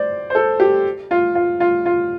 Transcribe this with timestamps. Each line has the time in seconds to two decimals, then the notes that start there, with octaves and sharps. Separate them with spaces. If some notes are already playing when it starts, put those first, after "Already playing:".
Already playing: C5 D5
0.30 C5
0.35 A4
0.60 G4
1.11 F4
1.35 F4
1.60 F4
1.86 F4